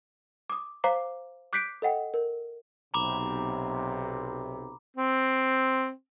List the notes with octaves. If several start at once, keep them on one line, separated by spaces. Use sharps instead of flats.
D6 D#6
C5 F5 A#5 D6 C7
D6 F#6 G6 B6 C7 D7
A4 D#5 F#5 G5
A#4
B1 C3 A#5 B5 D6
C4